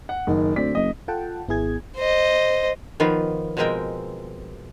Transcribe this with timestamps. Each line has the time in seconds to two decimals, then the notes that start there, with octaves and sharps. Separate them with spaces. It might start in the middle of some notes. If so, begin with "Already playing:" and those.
0.09 F#5
0.27 F#1 D#3
0.56 D2 C4 D5 B6
0.75 F#1 D#5
1.08 F4 A4 F#5 G5 A5
1.48 G#1 B3 E4 G#4 G#6
1.97 C5 D#5
3.00 D#3 F3 B3 F4
3.57 B2 F3 G#3 C4 A#4 G5